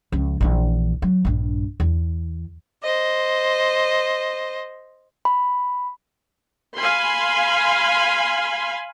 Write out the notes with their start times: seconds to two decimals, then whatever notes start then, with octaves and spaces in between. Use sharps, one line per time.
0.12 C#2 F3
0.41 A#1 E3
1.02 F#3
1.25 A#1 G2
1.80 E2
2.82 C5 D#5
5.25 B5
6.76 F5 G#5 B5 C6